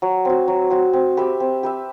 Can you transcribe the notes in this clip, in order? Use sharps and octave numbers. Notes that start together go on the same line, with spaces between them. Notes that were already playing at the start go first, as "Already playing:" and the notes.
F#3
C4 F#4
F#3
C4 F#4
C4
G4 B4 E5
C4
G4 B4 E5